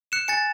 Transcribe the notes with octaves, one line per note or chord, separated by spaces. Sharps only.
F#6 C#7 E7
G#5 A6 C#7